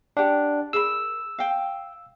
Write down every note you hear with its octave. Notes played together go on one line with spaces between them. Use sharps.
D4 G4 F#5
G#4 A#4 B5 E6
F5 G5